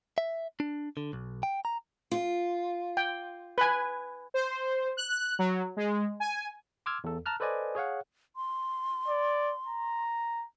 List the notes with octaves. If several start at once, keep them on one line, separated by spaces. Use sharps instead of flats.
E5
D4
D3
B1
G5
A#5
F4
G5
B4 G#5
C5
F#6
F#3
G#3
G#5
C6 D6 E6 F6 G#6
E2 A4
A5 A#5 F6 F#6
A4 B4 C5 D5 D#5 G#5
G#4 C#5 F5 F#5
C6
D5
A#5